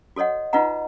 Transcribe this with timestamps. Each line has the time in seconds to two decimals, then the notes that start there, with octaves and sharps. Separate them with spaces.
0.16 F#4 A4 C#5 D#5 F#5
0.53 D#4 F4 B4 D#5 F#5 A#5